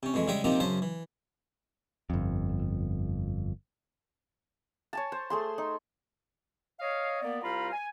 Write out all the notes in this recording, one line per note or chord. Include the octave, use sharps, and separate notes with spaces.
C3 C#4
F2 E3 G#3 A3
C#3 G3 G#3 E5 G5 D#6
C3 F3 A#3 C4 D#4 G4
F#2 C#3 C5 A5
E3
G1 F2
C#5 G#5 A5
C5
A3 G#4 C6
D#4
C#5 D#5 F5
A#3 B3 D5
C2 G3 F4 F5 A#5 B5
G#5